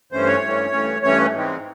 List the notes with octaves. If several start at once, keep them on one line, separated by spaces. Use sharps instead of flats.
G2 E3 A3 C#4 C5
C#5
G2 E3 A3 C#4
G2 E3 A3 C#4
G2 E3 A3 C#4 C#5
G#2 E3 G#3 C4